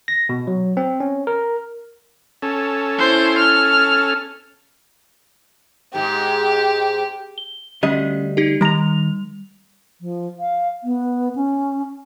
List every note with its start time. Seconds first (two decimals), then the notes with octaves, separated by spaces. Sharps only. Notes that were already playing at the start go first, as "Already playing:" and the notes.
0.08 A#6
0.29 B2
0.47 F#3
0.77 C4
1.00 C#4
1.27 A#4
2.42 C#4 A4
2.99 E4 C5
3.38 F6
5.95 G#2 G#3 G4
7.38 G7
7.83 D2 G3 C#4 D#5
8.37 D#4 G4
8.61 D#3 G3 A#5 F7
10.01 F3
10.40 F5
10.84 B3
11.35 C#4